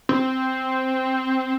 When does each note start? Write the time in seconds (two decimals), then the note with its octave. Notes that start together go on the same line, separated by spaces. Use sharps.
0.09 C4